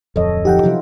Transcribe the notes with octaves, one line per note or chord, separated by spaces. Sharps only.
D1 F2 A4 C#5 D#5
F3 D#4 G4 F#5 G5
C3 F3 F#3 E4 F4